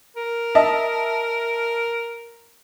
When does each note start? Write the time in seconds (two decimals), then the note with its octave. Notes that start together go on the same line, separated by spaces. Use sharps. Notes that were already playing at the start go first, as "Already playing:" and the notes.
0.16 A#4
0.55 D#5 E5 A5